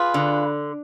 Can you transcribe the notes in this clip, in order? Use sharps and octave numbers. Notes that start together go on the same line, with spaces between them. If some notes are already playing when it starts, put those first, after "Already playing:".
Already playing: F4 G#4 B4
D3